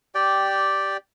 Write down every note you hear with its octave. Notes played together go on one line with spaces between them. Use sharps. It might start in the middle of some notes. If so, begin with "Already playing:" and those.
G4 D5 G5